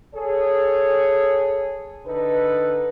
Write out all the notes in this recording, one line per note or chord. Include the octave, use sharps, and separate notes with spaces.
G#4 A4 C#5
D3 D#4 A4 B4